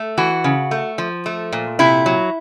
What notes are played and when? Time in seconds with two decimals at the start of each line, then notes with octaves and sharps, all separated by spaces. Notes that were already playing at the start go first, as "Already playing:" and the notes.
Already playing: A3
0.17 E3 F#4
0.44 C#3
0.71 A3
0.98 F3
1.26 A3
1.52 A#2
1.79 C3 E4
2.06 F#3